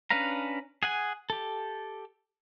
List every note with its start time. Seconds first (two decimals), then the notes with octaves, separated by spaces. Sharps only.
0.10 C#4 D4 B4 F5 A#5
0.83 G#4 F#5 G#5
1.30 G4 A4